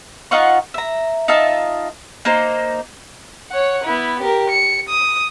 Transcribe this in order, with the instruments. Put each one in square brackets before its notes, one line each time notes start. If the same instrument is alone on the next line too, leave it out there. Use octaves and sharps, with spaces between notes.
[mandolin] D#4 F4 F#5 C#6
E5 A#5
D#4 F4 E5 A5
A#3 D#4 C5
[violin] C#5 F#5
B3 E4
G4 A#4
C#7
D#6